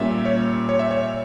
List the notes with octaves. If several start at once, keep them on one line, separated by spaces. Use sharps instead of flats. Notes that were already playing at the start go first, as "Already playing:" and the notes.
Already playing: A#2 G3 C#4 E5
C#5
C#5
E5
C#5